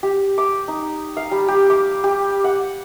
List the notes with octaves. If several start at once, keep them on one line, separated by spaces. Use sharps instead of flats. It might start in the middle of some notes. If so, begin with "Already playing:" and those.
G4
D6
D#4
F5
G3
G4
D6
G4
F#5